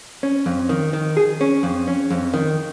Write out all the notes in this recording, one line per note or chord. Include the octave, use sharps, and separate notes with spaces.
C#4
F2
D#3
D#3
G#4
C#4
F2
C#4
F2
D#3